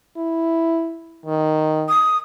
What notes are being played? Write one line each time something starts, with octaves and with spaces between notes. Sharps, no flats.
E4
D#3
D#6